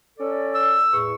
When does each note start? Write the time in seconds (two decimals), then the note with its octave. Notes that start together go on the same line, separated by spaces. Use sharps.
0.18 C#4 A4 D5
0.55 E6
0.92 E2 A2 C#6